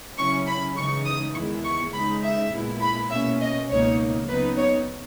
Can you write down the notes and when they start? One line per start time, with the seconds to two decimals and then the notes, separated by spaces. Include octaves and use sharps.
0.18 C#3 F#3 C#4 E4 C#6
0.47 B5
0.76 C#3 E3 G#3 D#4 C#6
1.06 D#6
1.35 E2 D#3 G#3 B3 E4 C#6
1.65 C#6
1.94 C#2 C#3 G#3 D#4 B5
2.24 E5
2.52 A#2 G#3 B3 E4
2.82 B5
3.11 B2 A#3 C#4 E5
3.41 D#5
3.69 C#2 B2 A#3 D#4 C#5
4.28 C#3 F#3 B3 D#4 B4
4.58 C#5